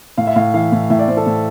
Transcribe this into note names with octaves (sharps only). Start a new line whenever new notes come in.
A2 F5
E5
A2 F5
E3 F5
A2
A2 E5
D5
A2 C5
A4
A2